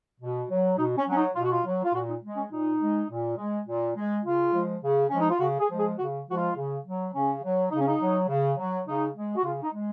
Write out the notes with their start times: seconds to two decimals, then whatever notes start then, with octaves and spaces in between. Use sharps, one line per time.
0.21 B2
0.50 F#3
0.78 B2 D#4
0.97 C#4
1.08 F#3 C#4
1.16 D#4
1.35 B2 F4
1.44 F#4
1.51 F4
1.65 F#3
1.84 F4
1.93 A#2 F#4
2.08 D#4
2.23 G#3
2.37 C#4
2.51 A#2 D#4
2.80 G#3
3.10 A#2
3.37 G#3
3.67 A#2
3.96 G#3
4.25 C#3 F4
4.54 F3 G#3
4.82 C#3
5.10 F3 G#3 C#4
5.20 D#4
5.31 F4
5.40 C#3 F#4
5.60 G#4
5.69 F3 G#3
5.78 G#4
5.98 C#3 F#4
6.27 F3 G#3 F#4
6.36 F4
6.56 C#3
6.85 F#3
7.14 C#3 C#4
7.42 F#3
7.71 C#3 D#4
7.79 C#4
7.87 D#4
8.01 F#3
8.29 C#3
8.57 F#3
8.87 C#3 D#4
9.15 G#3
9.36 F#4
9.44 C#3 F4
9.63 D#4
9.73 G#3